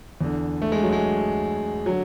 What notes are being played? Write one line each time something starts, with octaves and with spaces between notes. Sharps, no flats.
E2 D3
A3
G#3
F#3
G#3
D3 F#3